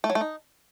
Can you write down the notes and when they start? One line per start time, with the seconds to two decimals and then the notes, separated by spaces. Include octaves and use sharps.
0.04 A3
0.10 F#3
0.15 A3
0.21 D#4